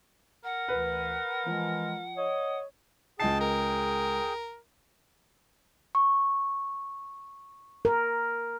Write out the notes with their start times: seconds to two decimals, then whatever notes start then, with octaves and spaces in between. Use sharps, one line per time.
0.44 A#4 F#5
0.68 D2 E3 B4
1.47 E3 F3 G#3
2.17 C#5 D#5
3.20 C#2 G#4 D#5 G5 A5 C7
3.41 A#4
5.95 C#6
7.85 A#4